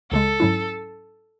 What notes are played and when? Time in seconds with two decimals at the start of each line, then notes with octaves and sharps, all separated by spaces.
0.11 C#2 C#3 G#3 A4
0.40 G#2 F#3 C#4 E4